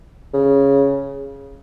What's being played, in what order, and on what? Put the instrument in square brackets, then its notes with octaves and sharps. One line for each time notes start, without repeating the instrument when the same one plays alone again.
[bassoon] C#3